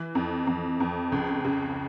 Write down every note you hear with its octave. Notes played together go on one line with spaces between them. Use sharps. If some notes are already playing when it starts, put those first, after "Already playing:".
Already playing: E3
F2
F2
F2
C#2
C#3